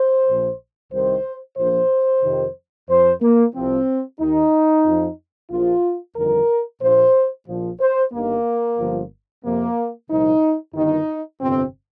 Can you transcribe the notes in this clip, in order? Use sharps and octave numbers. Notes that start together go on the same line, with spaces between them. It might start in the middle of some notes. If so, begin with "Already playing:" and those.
Already playing: C5
A#1 A#2 F3
C2 C3 D#3 C5
A#1 A#2 F3 C5
F2 C3 D#3
F2 F3 C5
A#3
C2 C3 F3 C4
D#2 D#3 D#4
F2 F3
A#1 A#2 F3 F4
G1 F2 D#3 A#4
A#1 A#2 F3 C5
A#1 A#2 F3
C5
G1 G2 D#3 A#3
G1 G2 F3
F2 C3 F3 A#3
C2 A#2 F3 D#4
G1 G2 D#3 D#4
G1 F2 C3 C4